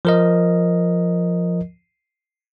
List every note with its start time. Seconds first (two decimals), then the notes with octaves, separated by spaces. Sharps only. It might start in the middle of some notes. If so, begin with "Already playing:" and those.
0.05 F3 A#4 D#5